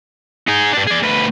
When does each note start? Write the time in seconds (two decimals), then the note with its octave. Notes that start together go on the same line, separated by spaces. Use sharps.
0.49 D#4 G#4
0.74 G2 D4
0.87 G#4 D5
1.03 D2 B4